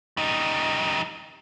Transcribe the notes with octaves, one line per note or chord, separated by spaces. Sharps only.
G3 D#4